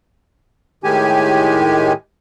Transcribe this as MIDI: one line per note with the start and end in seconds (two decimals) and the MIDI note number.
0.84 1.92 45
0.84 1.92 51
0.84 1.92 56
0.84 1.92 67
0.84 1.92 80